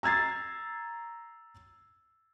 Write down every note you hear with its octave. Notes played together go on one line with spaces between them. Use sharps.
A#5 E6 G#6 A6 C7